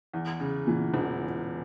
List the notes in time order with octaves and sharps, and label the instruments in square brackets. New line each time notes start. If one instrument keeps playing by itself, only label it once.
[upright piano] E2
C#3
[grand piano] A#2 [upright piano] E3
[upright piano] E1